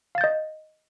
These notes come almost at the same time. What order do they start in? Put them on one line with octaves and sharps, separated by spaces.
F5 A6 G6 D#5